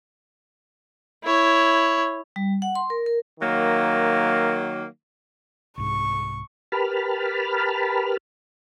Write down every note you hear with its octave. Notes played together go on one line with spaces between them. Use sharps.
E4 C#5
G3
F#5
C6
A#4
A#4
D#3 F#3 A#3
C2 G#2 C#6
G4 A#4 B4 A5 B5 F6